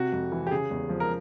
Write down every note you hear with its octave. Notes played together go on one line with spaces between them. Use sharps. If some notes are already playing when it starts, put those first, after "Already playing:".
Already playing: C3 F#4
F2
E3
G4
C#3 G#4
E2
F3
A#4